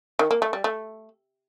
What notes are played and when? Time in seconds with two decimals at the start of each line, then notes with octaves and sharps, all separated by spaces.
0.19 D#3
0.31 A#3
0.42 A3
0.53 G3
0.64 A3